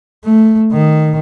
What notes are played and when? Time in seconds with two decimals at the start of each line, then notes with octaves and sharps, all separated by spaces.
0.25 A3
0.73 D#3